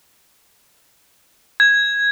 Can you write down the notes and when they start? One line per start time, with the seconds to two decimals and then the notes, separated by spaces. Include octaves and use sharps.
1.60 G#6